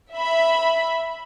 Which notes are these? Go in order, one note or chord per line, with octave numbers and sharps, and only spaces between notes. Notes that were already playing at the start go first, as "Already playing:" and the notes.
E5 B5